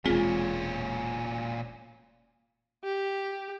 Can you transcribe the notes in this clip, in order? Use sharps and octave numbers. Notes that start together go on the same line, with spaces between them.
E1 A#2 G#3 C4 C#4 F4 G#4
G4